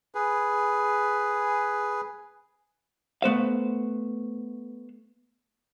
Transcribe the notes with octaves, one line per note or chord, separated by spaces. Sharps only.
G#4 B4
A3 B3 C5 F5